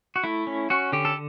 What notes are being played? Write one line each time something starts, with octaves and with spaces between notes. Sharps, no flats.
F#4
A3 E4
C#4
C#4 F#4
D3 G4
A4